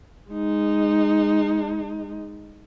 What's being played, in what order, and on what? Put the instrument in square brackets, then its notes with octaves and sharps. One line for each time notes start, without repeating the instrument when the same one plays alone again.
[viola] G#3 D#4